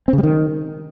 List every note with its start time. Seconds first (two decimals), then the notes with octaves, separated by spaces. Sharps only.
0.08 C4
0.13 C#3
0.18 G3
0.23 D#3